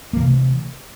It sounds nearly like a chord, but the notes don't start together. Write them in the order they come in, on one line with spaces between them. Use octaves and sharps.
A#3 E3 C3 A3